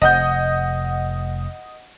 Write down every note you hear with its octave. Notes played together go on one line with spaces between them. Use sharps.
F1 D#5 F#5 G6